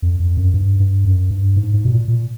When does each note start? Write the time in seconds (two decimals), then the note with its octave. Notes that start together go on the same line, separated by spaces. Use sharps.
0.02 F2
0.20 F2
0.37 F#2
0.54 G2
0.80 G2
1.05 F#2
1.31 G2
1.56 G#2
1.74 G#2
1.85 B2
1.90 A#2
2.08 A#2